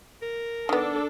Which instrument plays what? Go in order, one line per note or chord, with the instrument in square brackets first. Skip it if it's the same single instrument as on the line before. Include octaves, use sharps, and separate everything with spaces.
[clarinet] A#4
[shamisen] D#3 B3 [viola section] D4 A4